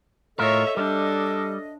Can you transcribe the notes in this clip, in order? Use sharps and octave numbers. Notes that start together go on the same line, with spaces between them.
A2 F4 A4 A#4 C#5 D#5 E5
G3 D4